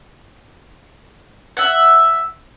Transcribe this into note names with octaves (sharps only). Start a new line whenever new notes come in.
E5 F#5